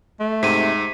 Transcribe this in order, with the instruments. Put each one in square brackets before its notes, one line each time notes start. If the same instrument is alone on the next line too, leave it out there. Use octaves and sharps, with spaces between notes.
[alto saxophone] A3
[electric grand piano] G#2 [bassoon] C3 [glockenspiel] B6 D#7